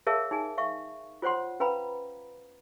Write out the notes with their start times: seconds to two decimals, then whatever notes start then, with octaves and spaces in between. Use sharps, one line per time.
0.07 G#4 A#4 C#5 E5 F5 A5
0.31 D#4 G#4 G#5
0.58 E5 F5 C#6
1.22 F4 C5 C#5 F#5 C6
1.60 C#4 B4 F5 A#5 B5